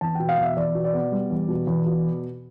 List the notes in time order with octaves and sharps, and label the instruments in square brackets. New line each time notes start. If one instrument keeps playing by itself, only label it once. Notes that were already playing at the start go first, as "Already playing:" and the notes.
[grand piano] E2 A5
B2 G5
F5
E2 E5
E2 D5
B2
D5
B3
G3
E2
B2
E2
B2